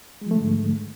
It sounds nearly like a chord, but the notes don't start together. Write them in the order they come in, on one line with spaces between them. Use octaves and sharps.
G#3 F3 A3 D3 G#2